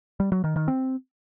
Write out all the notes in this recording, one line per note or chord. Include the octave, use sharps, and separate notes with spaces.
G3
F#3
D#3
D#3
C4